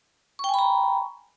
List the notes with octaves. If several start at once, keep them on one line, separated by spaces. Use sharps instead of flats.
G5 G#5 A#5 B5 C#6